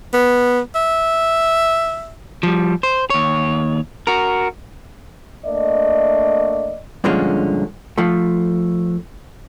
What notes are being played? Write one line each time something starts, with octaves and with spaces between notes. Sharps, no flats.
B3
E5
F3 G3
C5
D#2 C#5
F#4 A#4
A3 A#3 D4 D5 D#5
G2 A#2 D3 F3 G#3 C#4
F3 A3